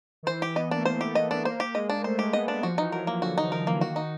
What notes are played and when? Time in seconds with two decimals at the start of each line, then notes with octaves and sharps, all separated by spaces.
0.23 D#3
0.27 E3 C5
0.42 G4
0.56 B3 D#5
0.71 A#3 D4
0.78 A3
0.85 A#3 C5
1.01 A3 G4
1.15 B3 D#5
1.30 B3 D4
1.45 A#3 C5
1.60 G4
1.74 G#3 D#5
1.90 D4
2.04 A3 C5
2.19 G#3 G4
2.33 B3 D#5
2.48 B3 D4
2.63 F3 F#4
2.78 E3 D#4
2.92 F#3 A#4
3.07 F#3 A#3
3.22 D3 F#4
3.37 F3 D#4
3.52 F3 A#4
3.66 E3 A#3
3.81 D#3 F#4
3.96 D#4